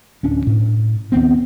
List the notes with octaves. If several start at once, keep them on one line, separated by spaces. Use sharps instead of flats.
D1 C#4 D4
A2
D#2 B3 C4